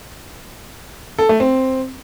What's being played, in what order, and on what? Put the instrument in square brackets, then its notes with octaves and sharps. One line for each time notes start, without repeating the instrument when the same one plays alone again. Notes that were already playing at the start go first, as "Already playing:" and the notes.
[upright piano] A4
A3
C4